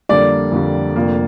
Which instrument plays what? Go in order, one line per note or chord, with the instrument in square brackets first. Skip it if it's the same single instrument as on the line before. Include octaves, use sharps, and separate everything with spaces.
[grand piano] F2 D3 G3 A#3 [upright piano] D5
[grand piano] F2 D3 G3 A#3
F1 F2 D3 A#3